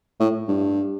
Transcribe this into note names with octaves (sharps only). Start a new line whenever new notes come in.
A2
G2